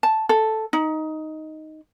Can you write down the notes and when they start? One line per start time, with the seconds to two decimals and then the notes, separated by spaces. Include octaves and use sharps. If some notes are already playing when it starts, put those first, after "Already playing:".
0.03 A5
0.29 A4
0.73 D#4